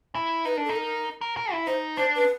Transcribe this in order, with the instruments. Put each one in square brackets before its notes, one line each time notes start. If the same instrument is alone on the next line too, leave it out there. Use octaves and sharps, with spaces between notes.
[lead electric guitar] E4
[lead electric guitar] D#4 [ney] B4
[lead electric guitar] D4 [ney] A#4
[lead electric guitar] D#4 [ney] A4
[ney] A#4
[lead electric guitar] A#4
A#4
E4
[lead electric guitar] D#4 [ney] C5
[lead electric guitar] D4 [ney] C5
[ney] B4